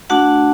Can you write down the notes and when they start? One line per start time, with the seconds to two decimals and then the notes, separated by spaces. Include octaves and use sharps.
0.10 A3 D4 F#4 F#5 A5